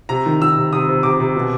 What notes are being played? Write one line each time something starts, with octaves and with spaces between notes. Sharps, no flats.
C3 A#5
D#3
D#3 E6
C3
C3 D#6
C3
C3 D6
C3
B2